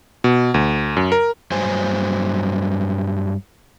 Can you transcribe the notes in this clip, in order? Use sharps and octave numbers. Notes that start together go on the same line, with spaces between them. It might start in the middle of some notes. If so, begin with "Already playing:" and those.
B2
D2
F#2
A#4
G2 F#3 C5 G#5